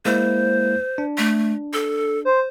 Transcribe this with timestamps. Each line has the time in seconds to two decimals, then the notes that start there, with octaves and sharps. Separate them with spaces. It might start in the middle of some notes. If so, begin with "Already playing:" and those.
0.05 G#3 A#3 E4 C5
0.98 D4
1.18 A3
1.73 A4
2.25 C5